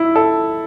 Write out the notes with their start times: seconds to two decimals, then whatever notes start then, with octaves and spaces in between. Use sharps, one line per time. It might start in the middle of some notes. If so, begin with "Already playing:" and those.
Already playing: E4
0.16 A4